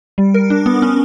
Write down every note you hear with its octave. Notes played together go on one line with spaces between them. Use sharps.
G3
A#4
D4
B3
C#4